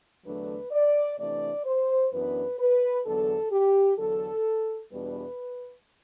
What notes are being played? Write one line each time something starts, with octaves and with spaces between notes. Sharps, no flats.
E2 D3 F#3 A3 D4 B4
D5
C3 E3 A3 D4 D5
C5
F#2 E3 B3 D4 B4
B4
E2 D3 F#3 B3 A4
G4
E2 D3 F#3 A4
E2 B2 G3 D4 B4